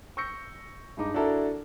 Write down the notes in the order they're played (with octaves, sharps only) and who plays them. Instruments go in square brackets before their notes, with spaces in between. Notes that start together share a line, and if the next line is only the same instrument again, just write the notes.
[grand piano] C#6 E6 G6 A#6 C#7
G2 G#3 D#4 D6
D4 E4 F#4 A4 A#4 E5